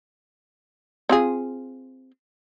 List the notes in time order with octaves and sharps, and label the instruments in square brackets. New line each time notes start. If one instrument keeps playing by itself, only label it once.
[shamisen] C4 F4 G#4